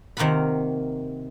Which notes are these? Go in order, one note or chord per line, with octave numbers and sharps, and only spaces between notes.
C3 D#3 A#3 F4 F#5 B5